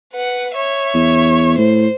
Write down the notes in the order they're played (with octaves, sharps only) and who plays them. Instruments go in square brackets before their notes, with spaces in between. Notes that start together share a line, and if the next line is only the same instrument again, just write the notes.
[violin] B4 F#5
C#5 E5
[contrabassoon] E2
[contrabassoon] A2 [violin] C5